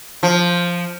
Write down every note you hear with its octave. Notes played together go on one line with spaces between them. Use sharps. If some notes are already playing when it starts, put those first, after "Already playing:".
F3